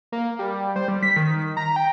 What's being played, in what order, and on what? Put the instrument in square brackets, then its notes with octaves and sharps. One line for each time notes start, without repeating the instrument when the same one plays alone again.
[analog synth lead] A#3
G3
C5
G3
B6
D#3
A#5
G5